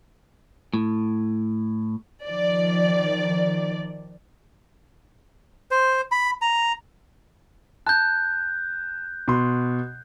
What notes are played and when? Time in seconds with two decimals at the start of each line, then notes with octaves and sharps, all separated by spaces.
0.74 A2
2.25 D#3 F3 D5
5.71 C5
6.11 B5
6.42 A#5
7.87 A5 F#6 G6
9.28 B2 C6